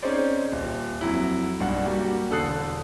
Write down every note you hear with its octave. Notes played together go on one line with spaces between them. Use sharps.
C4 C#4 D#4 G#4 C5 D5
D#1
F2 F#3 E4
B1 G2 D4 F#5
G3 A#3 F#4 G4
E1 D3 A4 D#6 F#6 C7